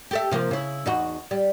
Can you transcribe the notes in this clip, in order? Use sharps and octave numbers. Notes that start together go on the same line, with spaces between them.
G4 A4 E5
C3 F3 A#3
C#3 E4
E2 D#4 F#4
G3